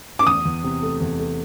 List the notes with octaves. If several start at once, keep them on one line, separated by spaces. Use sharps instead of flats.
D6
E2 D#6
E2
C3
A3
E2
A3